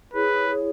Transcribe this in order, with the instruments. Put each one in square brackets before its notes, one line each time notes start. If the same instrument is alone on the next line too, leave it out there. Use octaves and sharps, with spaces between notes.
[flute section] E4 G#4 C#5 [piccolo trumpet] B4